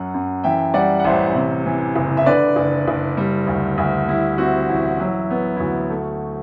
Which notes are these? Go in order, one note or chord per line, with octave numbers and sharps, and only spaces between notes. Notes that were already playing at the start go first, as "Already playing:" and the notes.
Already playing: F#2 F#3 F#5
F#2
E3 E5 G5
G3 D5 F#5
F#5
A1 C5 E5
C3
E3
F#1
E5
D3 B4 D5
F#1
F#1
G3
D2
D2
G3 E4
C4 F#4
A1 E4
F#3 E4
B3
E4
D2 F#4
A3